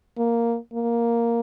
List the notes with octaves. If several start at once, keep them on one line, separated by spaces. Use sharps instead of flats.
A#3
A#3